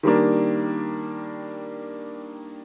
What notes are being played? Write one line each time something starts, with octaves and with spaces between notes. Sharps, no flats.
D#3 G3 A#3 D4